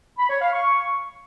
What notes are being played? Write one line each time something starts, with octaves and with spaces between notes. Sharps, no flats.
B5
C#5
F5
C#6